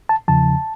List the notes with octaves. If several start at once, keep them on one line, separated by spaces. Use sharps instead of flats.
A5
E2 C#3 F3 A5